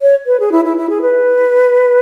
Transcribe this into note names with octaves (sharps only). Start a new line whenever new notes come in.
C#5
B4
G#4
E4
E4
E4
G#4
B4